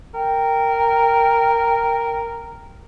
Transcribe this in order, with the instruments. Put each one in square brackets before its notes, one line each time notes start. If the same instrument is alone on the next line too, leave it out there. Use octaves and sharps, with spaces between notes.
[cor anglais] A#4 [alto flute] G5